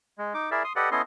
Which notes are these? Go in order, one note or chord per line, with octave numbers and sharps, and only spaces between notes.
G#3
D#4 D6
E4 G#4 A#4 D5 E5
C6 D#6
G4 A4 B4 D5 D#5 F#5
B3 C#4 E4 A4 D#5 C6